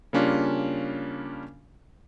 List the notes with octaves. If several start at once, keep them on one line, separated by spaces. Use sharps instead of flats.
C#3 G3 A#3 C#4 D4 F4